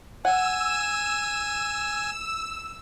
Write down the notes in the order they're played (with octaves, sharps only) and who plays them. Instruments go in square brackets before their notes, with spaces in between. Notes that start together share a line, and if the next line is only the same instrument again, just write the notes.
[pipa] F#5 [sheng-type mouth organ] G#5 [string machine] E6